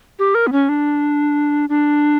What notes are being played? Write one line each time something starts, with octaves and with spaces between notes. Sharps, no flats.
G4
A#4
B3
C#4
D4
D4